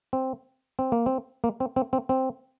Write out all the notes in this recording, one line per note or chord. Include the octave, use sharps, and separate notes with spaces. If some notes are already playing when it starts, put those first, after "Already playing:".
C4
C4
A#3
C4
A#3
C4
C4
C4
C4